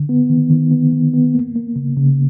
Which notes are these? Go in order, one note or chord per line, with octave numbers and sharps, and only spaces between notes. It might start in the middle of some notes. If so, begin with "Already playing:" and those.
Already playing: D3
B3
D#3
D#3
B3
D#3
B3
A#3
A#3
C#3
C#3